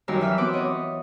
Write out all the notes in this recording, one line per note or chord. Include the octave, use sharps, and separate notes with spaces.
F#2 D#3 G3 F5 A#5 E6
E3 E5 E6 F6
B3 C4 F#5 D6
E3 C#5 D#5